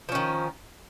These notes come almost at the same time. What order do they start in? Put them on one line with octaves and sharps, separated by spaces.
F3 C#4 D#3